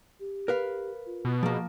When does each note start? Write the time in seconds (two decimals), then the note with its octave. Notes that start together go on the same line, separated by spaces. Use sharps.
0.20 G4
0.48 A#4 B4 F5
1.06 F4
1.25 B2
1.43 F3 A#3 G#4